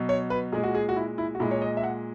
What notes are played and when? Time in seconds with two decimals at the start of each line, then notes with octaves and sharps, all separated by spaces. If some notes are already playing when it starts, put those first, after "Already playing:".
Already playing: B2 F#3
0.09 C#5
0.30 B4
0.52 A#2 G#3 G#4
0.63 F#4
0.75 G#4
0.89 F#4
0.96 E4
1.18 E4
1.35 F#4
1.40 A#2 G#3 E4
1.51 C#5
1.62 D#5
1.77 E5
1.83 F#5